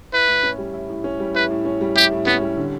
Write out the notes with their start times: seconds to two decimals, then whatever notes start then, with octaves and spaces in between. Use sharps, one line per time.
0.13 E4 B4
0.28 A2
0.43 C#4
0.58 G3
0.74 E4
0.89 A2
1.04 C#4
1.20 G3
1.35 E4 B4
1.50 A2
1.65 C#4
1.81 G3
1.95 E4 G4
2.11 A2
2.26 B3 C#4
2.41 G3
2.57 D3